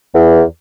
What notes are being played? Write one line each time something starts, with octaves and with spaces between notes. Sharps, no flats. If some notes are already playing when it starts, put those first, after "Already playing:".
E2